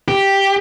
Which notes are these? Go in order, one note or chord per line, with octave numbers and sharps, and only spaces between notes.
G4